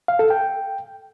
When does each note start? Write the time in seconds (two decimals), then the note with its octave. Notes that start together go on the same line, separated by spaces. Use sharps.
0.08 F5
0.19 A4
0.30 G5